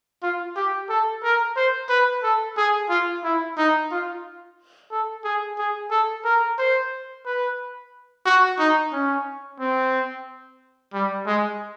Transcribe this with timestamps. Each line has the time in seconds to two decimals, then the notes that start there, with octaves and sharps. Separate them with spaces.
0.23 F4
0.56 G4
0.90 A4
1.23 A#4
1.57 C5
1.89 B4
2.23 A4
2.57 G#4
2.90 F4
3.24 E4
3.58 D#4
3.91 F4
4.92 A4
5.24 G#4
5.58 G#4
5.91 A4
6.25 A#4
6.59 C5
7.26 B4
8.26 F#4
8.59 D#4
8.93 C#4
9.60 C4
10.94 G3
11.27 G#3